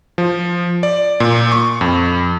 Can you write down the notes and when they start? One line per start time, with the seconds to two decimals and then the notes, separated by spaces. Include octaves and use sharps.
0.18 F3
0.83 D5
1.20 A#2
1.52 C#6
1.81 F2